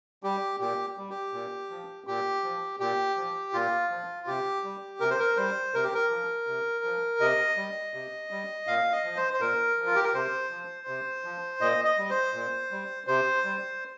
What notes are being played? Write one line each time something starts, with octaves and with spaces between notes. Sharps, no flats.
G3 G4
A#2 G4
G3
G4
A#2
F3
A#2 G4
F3
A#2 G4
F3
A#2 F4
F3
C3 G4
G3
C3 A#4
C5
A#4
G3 C5
C3 A#4
G4
A#4
F3
C3
F3
C3 D#5
G3
C3
G3
A#2 F5
D#5
F3
C5
C5
A#2 A#4
F3
F4
G4
A#4
C3 C5
F3
C3
F3
A#2 D#5
D#5
G3
C5
A#2
G3
C3 C5
G3